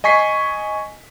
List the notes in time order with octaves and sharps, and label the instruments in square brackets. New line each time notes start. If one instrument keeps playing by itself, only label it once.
[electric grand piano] D#5 G#5 C#6 B6 C7